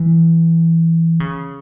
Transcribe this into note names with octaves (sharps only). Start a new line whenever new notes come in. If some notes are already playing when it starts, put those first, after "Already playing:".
Already playing: E3
C#3